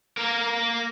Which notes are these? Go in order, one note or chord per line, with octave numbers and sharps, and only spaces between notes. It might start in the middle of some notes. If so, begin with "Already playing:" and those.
A#3 A#4